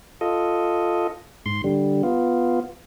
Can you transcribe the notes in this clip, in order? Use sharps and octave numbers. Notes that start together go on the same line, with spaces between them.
F4 A4 D#5
G#2 C6
D3 G3
B3 F4